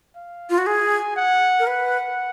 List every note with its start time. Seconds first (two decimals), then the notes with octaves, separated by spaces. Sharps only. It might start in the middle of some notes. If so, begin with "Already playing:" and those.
0.16 F5
0.50 F4
0.58 F#4
0.66 G#4 G#5
1.17 F#5
1.59 A#4
1.67 B4 F#5